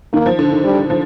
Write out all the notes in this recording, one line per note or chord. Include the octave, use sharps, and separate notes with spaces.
D#3 A#3
F3
D3
D#3
G3
F3